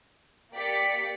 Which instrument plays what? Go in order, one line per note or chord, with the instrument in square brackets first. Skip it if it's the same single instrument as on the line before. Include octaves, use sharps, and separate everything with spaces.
[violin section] A#3 G4 D5 B6 C#7